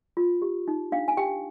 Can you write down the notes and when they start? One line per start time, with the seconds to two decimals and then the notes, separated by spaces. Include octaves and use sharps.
0.17 F4
0.42 G4
0.68 D#4
0.92 D4 F5
1.08 G#5
1.17 G4 G5